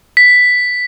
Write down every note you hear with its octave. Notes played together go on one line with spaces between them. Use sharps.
B6